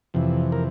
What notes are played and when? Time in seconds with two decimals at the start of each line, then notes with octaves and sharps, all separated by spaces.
0.14 F2 C3 E3
0.52 A#4